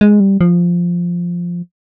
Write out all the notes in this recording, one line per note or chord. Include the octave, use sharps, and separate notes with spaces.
G#3
G3
F3